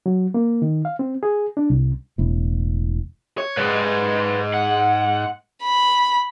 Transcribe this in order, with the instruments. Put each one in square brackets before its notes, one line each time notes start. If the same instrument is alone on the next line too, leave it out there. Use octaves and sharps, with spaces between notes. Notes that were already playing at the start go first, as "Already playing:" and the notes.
[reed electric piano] F#3
A#3
D#3
F5
C4
G#4
D4
C2
[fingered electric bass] E1 A2
[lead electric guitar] C#5
[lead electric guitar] G#2 G#3 [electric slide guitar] B4 D5
[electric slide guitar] F#5
[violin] B5